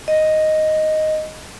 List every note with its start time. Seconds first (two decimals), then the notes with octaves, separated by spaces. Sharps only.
0.08 D#5